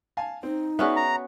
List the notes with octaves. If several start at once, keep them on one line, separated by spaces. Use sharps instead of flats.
F5 G#5 A5
C4 D#4
B3 C#4 F#4 G#4 D5 E5
A#5